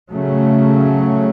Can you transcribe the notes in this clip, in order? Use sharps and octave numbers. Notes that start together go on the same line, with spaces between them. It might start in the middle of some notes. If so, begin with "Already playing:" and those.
C#3 F#3 A3 C#4